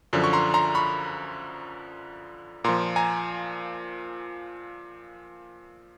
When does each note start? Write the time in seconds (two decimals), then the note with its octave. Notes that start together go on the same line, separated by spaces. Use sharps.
0.13 F#2 D3 F3
0.24 C#6
0.33 A#5 C6
0.54 A#5 C6
0.75 B5 C#6
2.64 A#2 F3 A#5 C6
2.96 G#5 A#5